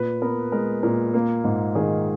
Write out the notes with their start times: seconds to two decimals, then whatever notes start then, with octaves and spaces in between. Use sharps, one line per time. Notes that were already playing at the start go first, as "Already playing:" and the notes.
Already playing: A#2 B4
0.22 B3 A#4
0.52 G#3 A#4
0.83 A#2 A#4
1.14 A#3
1.44 G#2
1.75 D#3 G#4